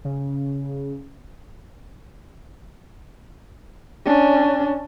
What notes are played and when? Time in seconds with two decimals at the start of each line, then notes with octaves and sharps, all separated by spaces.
0.05 C#3
4.06 C#4 D4